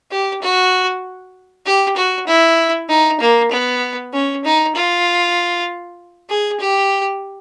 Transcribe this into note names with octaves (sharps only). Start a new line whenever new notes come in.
G4
F#4
G4
F#4
E4
D#4
A#3
B3
C#4
D#4
F4
G#4
G4